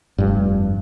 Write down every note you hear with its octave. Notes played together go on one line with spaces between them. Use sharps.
F1 G2